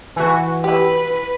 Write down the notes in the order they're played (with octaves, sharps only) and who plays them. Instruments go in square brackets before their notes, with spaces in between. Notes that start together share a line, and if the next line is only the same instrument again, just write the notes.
[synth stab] E3 F#4
[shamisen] E4 G4 [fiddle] B4